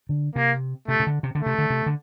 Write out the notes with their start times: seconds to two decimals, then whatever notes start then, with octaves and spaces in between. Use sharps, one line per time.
0.09 D3
0.36 C3 A#3
0.88 C3 A3
1.00 C3
1.07 D3
1.23 C3
1.35 D3
1.41 A3
1.46 C3
1.58 D3
1.70 C3
1.86 D3